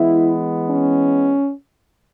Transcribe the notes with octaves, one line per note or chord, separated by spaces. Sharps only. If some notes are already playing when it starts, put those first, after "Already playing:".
Already playing: E3 G#3 B3 E4
C#4